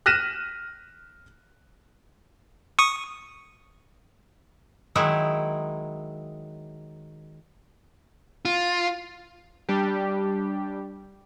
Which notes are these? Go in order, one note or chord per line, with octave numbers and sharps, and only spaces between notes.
F6 F#6 A#6 B6 D#7 E7
C#6 D#6
D#3 F#3 G#3 D#4 E4
F4
G3 D4 G4